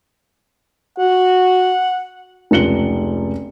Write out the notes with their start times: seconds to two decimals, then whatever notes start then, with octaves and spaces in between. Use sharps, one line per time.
0.99 F#4 F#5
2.51 F1 C#2 F4 C#7 F#7 G7